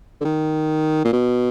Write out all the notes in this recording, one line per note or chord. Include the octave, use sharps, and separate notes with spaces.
D3
D#3
A#2
B2